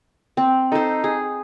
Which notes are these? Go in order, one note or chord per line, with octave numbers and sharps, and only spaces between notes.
C4
D#4 A4 C5
G#4